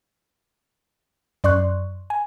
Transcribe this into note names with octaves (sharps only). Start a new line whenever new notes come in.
F#2 D5 C6 C#6 F#6
G#5